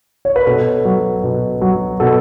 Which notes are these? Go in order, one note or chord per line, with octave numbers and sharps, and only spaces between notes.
C#5
B4
B2 A4
F#3
B2
F#3
B2 A4